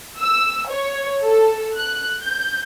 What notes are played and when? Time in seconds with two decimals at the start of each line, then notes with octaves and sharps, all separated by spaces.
0.19 E6
0.69 C#5
1.22 A4
1.75 F#6
2.22 G6